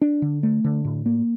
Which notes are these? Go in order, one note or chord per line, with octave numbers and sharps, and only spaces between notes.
D4
D3
A3
D3
A2
A#3